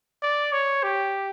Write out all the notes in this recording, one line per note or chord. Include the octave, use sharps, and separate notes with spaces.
D5
C#5
G4